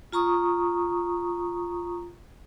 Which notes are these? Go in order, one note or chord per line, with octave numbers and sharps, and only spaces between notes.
F4 A#5 C#6 D#6